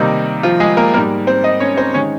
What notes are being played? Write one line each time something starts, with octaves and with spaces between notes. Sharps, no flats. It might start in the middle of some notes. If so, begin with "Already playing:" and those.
Already playing: C3 D#3 G3 A#3 D#4
F3 F4
G#3 G#4
A#3 A#4
G#2 G3 A#3 A#4
C4 C5
D#4 D#5
C#4 C#5
C4 C5
D#3 G#3 C#4 C#5